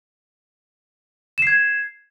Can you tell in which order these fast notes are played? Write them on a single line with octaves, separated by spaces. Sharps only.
E7 C7 G#6